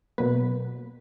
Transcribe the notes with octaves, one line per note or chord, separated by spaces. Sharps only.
B2 F#3 A#3 B4